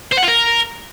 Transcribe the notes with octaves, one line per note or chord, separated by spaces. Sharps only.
C5
F#5
F4
A#4